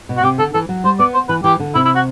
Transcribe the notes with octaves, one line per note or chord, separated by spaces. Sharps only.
B2
F#4
C3 G4
D3 A4
E3 A4
F#3
G3 C5
B3 D5
C5
E3 B4
E3 G4
D3
C3 E4
E4
F#4